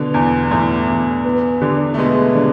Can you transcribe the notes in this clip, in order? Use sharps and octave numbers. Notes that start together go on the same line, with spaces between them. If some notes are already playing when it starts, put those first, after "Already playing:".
Already playing: B2 D3 B3
E2
E2 A2 A3
E2
B3
D3
A3
B2 G#3 B3
D3